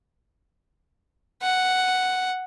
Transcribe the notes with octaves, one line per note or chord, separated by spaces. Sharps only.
F#5